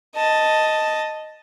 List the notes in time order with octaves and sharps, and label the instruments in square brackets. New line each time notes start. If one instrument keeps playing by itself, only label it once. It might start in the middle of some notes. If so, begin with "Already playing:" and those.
[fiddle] D#5 A5